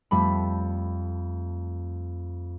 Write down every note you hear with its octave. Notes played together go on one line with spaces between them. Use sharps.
F2 G3 A3 B5